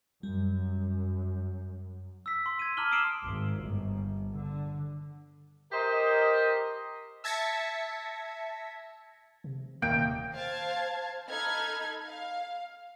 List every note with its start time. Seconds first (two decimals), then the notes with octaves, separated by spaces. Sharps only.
0.23 F#2 G3
2.26 E6 B6
2.46 C6
2.59 G#6 D#7
2.77 A5 A#5 D6 F6 F#7 G7
2.92 D#6 E6 C7 D7 E7 F#7
3.25 G#1
3.63 G1
4.33 D3
5.72 G4 A#4 C5 D#5
7.24 E5 A5 G#6 A#6 B6 C#7
9.44 C3
9.82 D#1 D#3 A#3 G5
10.34 C5 F5 A5 G#6
11.29 D#4 A4 B5 F6 G#6
12.05 F5